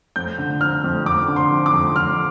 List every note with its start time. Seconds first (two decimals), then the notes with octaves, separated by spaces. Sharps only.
0.16 F2 G6
0.38 D3
0.61 F3 F6
0.84 F2
1.05 F2 D6
1.28 D3
1.36 C6
1.51 F3
1.66 D6
1.73 F2
1.96 F2 F6